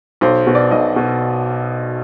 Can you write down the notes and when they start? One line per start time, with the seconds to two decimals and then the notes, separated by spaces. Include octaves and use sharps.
0.21 B1 C5
0.47 B2
0.55 D5
0.71 B1 D#5
0.96 B2